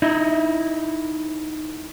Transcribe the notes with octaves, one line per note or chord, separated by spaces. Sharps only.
D#4 E4 D#5 E5